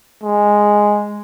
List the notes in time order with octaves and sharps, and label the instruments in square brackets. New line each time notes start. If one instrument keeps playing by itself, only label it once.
[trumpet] G#3